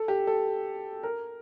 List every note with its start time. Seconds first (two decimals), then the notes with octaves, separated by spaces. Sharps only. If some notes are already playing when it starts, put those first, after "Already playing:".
Already playing: A4
0.08 G4
0.27 A4
1.03 A#4